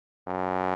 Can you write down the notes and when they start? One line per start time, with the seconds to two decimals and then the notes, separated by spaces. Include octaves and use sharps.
0.27 F#2